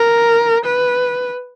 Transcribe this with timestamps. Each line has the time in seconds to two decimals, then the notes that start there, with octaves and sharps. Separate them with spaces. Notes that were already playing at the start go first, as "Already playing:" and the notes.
Already playing: A#4
0.65 B4